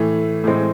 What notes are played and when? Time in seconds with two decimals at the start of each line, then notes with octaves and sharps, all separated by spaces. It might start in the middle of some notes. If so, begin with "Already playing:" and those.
Already playing: A2 E3 A3
0.44 A2 E3 G#3 C4